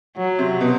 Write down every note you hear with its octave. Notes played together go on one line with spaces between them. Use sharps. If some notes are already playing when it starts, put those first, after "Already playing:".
F#3
C3
B2